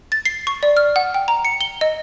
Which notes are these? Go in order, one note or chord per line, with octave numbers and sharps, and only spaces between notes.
A6
C7
C#6
D5
F6
F#5
G5
A#5
C#7
G7
D#5